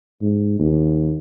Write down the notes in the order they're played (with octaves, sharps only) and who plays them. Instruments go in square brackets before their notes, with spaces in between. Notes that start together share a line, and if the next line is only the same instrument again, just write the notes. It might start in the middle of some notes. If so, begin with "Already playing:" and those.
[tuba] G#2
D#2